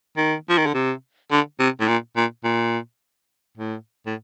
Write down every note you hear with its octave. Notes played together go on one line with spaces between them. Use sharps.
D#3
F3
D#3
D3
C3
D3
C3
A2
A#2
A#2
A#2
A2
A2